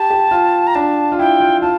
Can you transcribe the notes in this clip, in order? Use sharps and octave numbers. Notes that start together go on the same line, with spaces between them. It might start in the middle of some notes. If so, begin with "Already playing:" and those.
Already playing: G4 A5
G4
F4
A#5
D4 A5
F4
E4 G5
F4
F4 A5